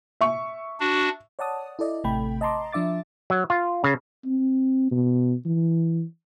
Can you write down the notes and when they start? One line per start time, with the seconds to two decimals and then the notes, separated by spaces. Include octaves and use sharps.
0.21 E5 C#6
0.80 D4 F#4
1.39 C#5 D5 F#5 A5 D#6
1.79 E4 A4 D5 D#5
2.04 A1 C3 A3 G5 B5
2.41 D#5 A5 A#5 C6 D6
2.72 F3 D4 E5 D6 A6
3.30 F#3
3.50 F4
3.84 C#3
4.25 C4
4.91 B2
5.46 E3